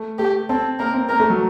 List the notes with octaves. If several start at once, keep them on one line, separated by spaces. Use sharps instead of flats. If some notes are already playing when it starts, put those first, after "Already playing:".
Already playing: A3
A3 G4
C4 A4
A#3 A#4
C4
A#3 A#4
A3
F#3